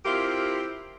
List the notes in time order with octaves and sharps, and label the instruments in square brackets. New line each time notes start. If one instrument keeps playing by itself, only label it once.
[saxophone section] C4 E4 F4 G4 A#4